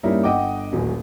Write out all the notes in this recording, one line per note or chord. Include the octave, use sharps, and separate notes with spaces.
G2 G3 A#3 C#4 D#4 E4
G1 D#5 F#5 G5 D6
D#1 A1 F#3